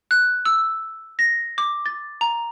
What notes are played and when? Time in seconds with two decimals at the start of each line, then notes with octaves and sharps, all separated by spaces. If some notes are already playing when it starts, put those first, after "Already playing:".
0.11 F#6
0.45 E6
1.19 A#6
1.58 D6
1.86 A6
2.21 A#5